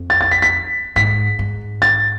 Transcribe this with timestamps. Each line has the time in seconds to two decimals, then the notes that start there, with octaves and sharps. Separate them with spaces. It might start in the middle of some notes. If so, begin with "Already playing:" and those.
Already playing: F2
0.10 A6
0.21 A6
0.31 B6
0.42 B6
0.96 G#2 B6
1.39 G#2
1.82 A6